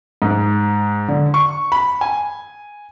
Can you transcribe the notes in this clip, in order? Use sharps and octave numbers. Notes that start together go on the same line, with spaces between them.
G#2
D3
C#6
B5
G#5